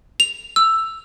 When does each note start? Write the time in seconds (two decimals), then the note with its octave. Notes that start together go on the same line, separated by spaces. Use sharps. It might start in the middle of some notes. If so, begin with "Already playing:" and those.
0.20 F7
0.56 E6